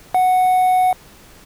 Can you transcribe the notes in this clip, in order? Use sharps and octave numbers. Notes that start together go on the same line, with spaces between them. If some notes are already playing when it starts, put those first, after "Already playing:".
F#5